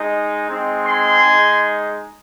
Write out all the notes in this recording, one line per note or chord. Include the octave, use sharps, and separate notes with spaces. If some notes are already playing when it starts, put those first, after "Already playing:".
Already playing: G#3 D#4
G#3 C4 D#4
G#5 C6
G#3 D#4